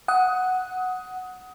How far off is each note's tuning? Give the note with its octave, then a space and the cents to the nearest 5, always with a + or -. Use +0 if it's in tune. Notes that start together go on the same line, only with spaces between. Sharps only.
F#5 +0 D#6 +20